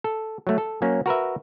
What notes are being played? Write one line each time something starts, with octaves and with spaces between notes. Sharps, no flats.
A4
F#3 A3
A4
F#3 A#3 C#4
F#4 A#4 B4 E5